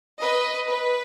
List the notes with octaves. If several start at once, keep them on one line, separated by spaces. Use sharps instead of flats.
B4 D#5
B4